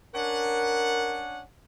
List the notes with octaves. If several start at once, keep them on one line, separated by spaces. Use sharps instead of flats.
C#4 D4 A#4 F#5